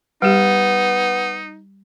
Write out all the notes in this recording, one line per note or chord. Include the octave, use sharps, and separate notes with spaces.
G3 B3 D#4 G4